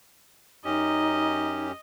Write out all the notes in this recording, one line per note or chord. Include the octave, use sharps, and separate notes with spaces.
F#2 C#4 D#4 G4 D#5